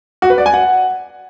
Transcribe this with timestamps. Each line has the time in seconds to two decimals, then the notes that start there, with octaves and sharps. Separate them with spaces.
0.22 F#4
0.30 B4
0.38 D5
0.46 G#5
0.54 F#5